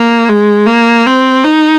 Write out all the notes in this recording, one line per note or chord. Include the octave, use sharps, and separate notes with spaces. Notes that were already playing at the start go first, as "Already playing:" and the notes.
Already playing: A#3
G#3
A#3
C4
D#4